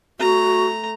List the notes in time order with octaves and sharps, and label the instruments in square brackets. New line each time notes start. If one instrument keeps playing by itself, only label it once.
[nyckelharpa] A3 A#5 [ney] F#4